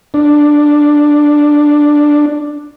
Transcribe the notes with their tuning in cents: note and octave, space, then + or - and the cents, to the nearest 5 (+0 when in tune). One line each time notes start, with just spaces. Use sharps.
D4 +5